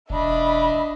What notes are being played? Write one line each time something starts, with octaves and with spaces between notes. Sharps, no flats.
E1 D4 D#5 E5 B5